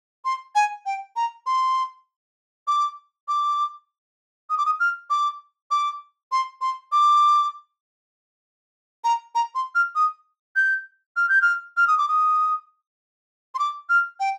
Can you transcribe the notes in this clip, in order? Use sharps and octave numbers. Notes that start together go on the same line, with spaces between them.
C6
G#5
G5
A#5
C6
D6
D6
D#6
D6
D#6
F6
D6
D6
C6
C6
D6
A#5
A#5
C6
F6
D#6
G6
F6
G6
F6
F6
D#6
D6
D#6
C6
D6
F6
G5